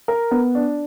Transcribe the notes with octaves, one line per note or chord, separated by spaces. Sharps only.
A#4
B3
D4